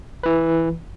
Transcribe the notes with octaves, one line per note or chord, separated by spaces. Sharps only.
E3 B4